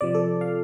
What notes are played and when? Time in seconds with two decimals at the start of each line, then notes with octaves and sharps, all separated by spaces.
0.01 C3 F3 D5
0.15 A4
0.41 F5